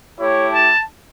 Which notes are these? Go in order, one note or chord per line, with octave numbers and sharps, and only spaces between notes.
A3 E4 G4 C#5
A5